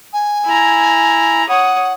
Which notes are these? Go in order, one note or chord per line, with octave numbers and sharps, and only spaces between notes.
G#5
E4 A#5
C#5 F#5 D#6